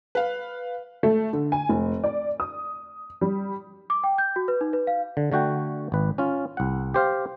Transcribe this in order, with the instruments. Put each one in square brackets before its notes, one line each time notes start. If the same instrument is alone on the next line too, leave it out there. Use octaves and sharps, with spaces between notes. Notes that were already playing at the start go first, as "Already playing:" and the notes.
[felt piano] B4 F5
[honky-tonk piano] A3
D3
G#5
F1
D5
D#6
G3
[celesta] D6
G5
G6
F#4
B4
D#4
B4
F5
[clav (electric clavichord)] D3
D3 A3 F#4 G5
G#1 B4
C#4 F4
C2 F#5
G4 C5 F5